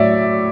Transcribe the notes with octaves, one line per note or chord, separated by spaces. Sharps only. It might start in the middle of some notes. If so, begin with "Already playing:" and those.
Already playing: A2 F#3 C#5 D5 E5